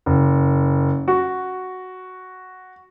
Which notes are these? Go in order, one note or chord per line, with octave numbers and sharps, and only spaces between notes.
F#1
F#4